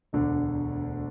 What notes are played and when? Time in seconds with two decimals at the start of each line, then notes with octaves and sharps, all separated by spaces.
0.13 E1 D2 D3